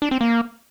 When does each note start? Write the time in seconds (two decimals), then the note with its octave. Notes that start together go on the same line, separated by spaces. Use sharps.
0.02 D4
0.11 C4
0.21 A#3